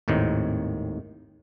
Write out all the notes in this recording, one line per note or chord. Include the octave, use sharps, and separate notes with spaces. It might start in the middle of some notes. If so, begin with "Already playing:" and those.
G#1 D#2 A2 D#3 C4